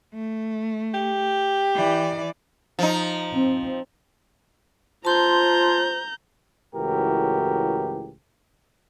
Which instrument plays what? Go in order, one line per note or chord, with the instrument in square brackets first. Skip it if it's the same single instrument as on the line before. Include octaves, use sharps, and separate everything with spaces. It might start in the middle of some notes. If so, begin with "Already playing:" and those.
[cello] A3
[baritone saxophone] G4
[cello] E3 D5
[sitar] F3 D#4
[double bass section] C4
[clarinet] F4 [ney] C5 [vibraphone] A5 C6 [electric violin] A#5 G6
[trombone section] C#2 A2 E3 F#4 G4 A#4